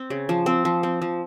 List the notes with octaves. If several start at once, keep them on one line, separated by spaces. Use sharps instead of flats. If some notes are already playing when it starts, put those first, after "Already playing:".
Already playing: C4
C#3
F3
C4
F3
C4
F3